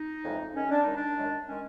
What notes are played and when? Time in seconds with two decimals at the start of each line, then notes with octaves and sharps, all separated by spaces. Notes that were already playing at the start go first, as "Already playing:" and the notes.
Already playing: D#4
0.24 F2 C#3 E3 G#3
0.54 F#2 D#3 G#3 C#4
0.70 D4
0.82 F#2 D#3 G#3 D#4
0.95 D4
1.17 F#2 D#3 G#3
1.48 D#3 G#3 C#4